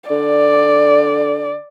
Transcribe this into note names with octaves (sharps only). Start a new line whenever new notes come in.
D3 D5